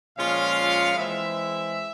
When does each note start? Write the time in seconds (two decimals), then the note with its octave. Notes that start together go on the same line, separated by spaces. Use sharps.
0.16 A#2 F3 G#3 C#4 F4 F5
0.96 E3 G#3 C4 E4 E5